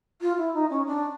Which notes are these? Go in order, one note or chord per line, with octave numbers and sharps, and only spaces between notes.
F4
E4
D#4
C#4
D4